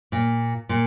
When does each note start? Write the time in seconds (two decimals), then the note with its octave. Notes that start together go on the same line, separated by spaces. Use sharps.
0.12 A#2
0.69 A#2